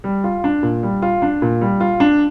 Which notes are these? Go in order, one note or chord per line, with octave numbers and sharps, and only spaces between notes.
G3
F4
D4
A#2
G3
F4
D4
A#2
G3
F4
D4